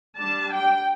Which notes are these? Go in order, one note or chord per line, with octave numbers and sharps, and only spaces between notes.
G3 D4 A5
G5